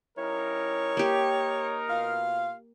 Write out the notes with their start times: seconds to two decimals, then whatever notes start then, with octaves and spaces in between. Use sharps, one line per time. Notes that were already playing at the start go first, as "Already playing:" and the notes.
0.18 G3 C#4 D#4 E4 A#4 C#5
0.97 A#3 G4
1.90 B2 F4 F5